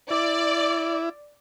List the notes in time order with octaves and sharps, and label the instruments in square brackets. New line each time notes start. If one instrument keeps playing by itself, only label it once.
[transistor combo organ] E4 [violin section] D5